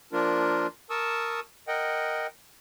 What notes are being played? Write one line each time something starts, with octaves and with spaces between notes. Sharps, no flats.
F3 A#3 D4 F4 A#4
A#4 A5 C#6 D#6 E6
A#4 D#5 F#5 G5